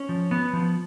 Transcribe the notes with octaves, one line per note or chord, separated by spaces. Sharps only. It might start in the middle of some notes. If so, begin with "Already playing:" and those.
Already playing: C#4
F3
B3
F3